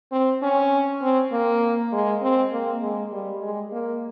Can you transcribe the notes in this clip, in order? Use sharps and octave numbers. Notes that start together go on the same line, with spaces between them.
C4
C#4
C4
A#3
G#3
C4
A#3
G#3
G3
G#3
A#3